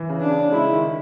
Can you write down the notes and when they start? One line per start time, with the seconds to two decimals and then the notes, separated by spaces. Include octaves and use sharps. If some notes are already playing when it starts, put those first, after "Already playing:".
Already playing: E3
0.09 C#3
0.20 D4
0.31 C#3
0.52 G#3 E4
0.73 D#3